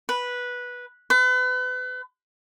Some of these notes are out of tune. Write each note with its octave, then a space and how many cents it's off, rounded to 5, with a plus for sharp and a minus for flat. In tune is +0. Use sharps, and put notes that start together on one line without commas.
B4 -10
B4 +35